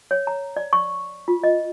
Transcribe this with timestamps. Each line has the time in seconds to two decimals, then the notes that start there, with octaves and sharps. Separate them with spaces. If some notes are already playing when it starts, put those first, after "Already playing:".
0.11 C#5
0.27 A#5
0.57 D5
0.73 C#6
1.28 F4
1.43 D#5